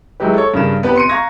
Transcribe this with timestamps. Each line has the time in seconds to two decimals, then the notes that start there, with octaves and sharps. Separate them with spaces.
0.20 F#3 G#3 E4 G4 B4
0.34 A4 C#5
0.54 G2 C#3 A#4 E7
0.83 B3 C4 G4 B4
0.95 C6 C#7 D#7
1.09 F5 A#5 C#6 G#6 A#6